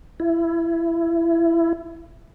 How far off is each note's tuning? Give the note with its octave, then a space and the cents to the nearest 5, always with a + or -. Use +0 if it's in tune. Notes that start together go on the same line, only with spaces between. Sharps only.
E4 +20